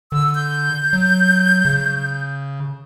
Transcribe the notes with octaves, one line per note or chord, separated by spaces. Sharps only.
D3 E6
G6
F#3
C#3